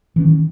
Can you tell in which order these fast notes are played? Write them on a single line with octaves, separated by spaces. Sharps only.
E3 C#4 D#3